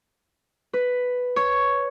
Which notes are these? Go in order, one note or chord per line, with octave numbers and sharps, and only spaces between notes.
B4
C#5